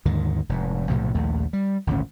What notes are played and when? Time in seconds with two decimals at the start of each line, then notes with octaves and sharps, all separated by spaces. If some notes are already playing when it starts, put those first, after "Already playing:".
0.05 D#2 G#2 D3 D#3
0.49 F1 G#2
0.89 B1 A2 C3 F3
1.14 A#1 D#2 A3
1.53 G3
1.87 G#1 D2 A#2 C#4